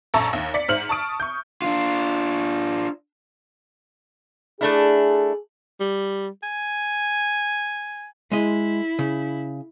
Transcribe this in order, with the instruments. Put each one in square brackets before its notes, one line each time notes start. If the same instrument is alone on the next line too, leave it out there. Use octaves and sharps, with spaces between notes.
[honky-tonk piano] A#1 F#2 A4 A5 A#5 C#6
D#2
D5 B6 C#7
G#2 C5 F6 C#7 F#7
A5 C#6 D#6 D7
C#6 G6
[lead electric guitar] D4 F4
[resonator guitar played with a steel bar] A3 D4 E4 [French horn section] G#4
[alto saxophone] G3
G#5
[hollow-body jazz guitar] G#3 D#5 [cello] E4
[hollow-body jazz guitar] C#3